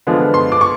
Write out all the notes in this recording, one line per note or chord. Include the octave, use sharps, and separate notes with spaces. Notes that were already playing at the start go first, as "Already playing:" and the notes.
D3 F3 G#3 B3
C6
D6
C#6